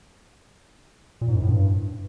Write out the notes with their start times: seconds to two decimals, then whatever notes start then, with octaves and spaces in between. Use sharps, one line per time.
1.21 A#2
1.28 G#2
1.35 F#2
1.42 A2
1.49 G2